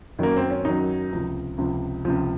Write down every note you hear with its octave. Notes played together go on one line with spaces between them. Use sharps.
F#2 D#3 F#3 A#3
C4
C#4
F#2 D#3 F#3 D#4
C#2 C3 F3
C#2 C3 F3
C#2 C3 F3